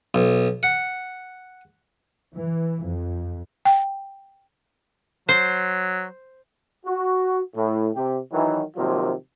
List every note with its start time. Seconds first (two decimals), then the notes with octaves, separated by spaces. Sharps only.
0.14 B1
0.63 F#5
2.35 E3
2.83 F2
3.65 G5
5.29 F#3 C5
6.86 F#4
7.56 A2
7.95 C3 G4
8.32 D#3 E3 F#3
8.77 C3 D#3 F3 F#3 A#3 F4